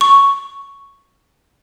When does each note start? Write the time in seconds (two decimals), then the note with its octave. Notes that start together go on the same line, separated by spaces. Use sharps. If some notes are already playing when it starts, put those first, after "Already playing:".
0.01 C#6